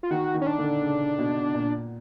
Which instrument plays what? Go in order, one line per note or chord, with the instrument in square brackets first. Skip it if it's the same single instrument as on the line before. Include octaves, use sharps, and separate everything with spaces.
[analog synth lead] F4
[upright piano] D#3 [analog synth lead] F#4
[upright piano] D#3
[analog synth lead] C#4
D4
[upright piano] D3
C#3
B2
A#2